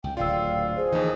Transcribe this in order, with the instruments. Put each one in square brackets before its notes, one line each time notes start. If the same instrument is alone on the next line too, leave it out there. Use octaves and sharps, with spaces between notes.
[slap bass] C#2 [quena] G5
[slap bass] D1 D2 A#2 [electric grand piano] F4 [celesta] D5 G5 E6 [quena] F5
[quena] G#4 [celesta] C5
[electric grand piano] D#2 D#4 [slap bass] E3 F3